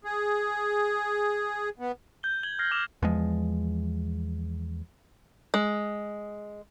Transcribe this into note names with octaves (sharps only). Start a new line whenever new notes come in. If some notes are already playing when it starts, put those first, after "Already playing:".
G#4
B3
G6 G7
G#6 F#7 G7
F6 G#6 A#6 C7
D6 E6 F6 G6 E7 F7
E2 F3 G#3
G#3